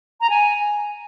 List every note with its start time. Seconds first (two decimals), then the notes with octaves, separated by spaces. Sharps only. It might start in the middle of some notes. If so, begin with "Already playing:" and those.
0.21 A#5
0.30 G#5